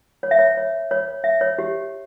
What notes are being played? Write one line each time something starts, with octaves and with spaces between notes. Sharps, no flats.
C#5
E5
C#5
C#5
C#5
E5
C#5
G4